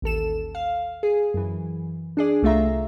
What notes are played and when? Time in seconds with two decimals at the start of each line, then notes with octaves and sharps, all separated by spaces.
0.02 A1 D#2 A4 E7
0.55 F5
1.03 G#4
1.34 F#2 E3
2.17 D4 G#4 D5
2.43 C2 A3 F4 E5 A#5